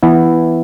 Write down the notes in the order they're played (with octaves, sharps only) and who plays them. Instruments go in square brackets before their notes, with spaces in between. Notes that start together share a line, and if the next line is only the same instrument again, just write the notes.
[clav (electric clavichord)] E3 B3 E4